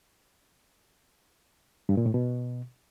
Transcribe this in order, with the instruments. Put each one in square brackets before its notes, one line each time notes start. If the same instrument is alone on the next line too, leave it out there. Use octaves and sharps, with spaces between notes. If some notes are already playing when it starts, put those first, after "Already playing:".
[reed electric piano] G2
A#2
A2
B2